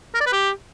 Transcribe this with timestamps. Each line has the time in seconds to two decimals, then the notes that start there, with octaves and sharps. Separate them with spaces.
0.15 A#4
0.21 D5
0.27 B4
0.33 G4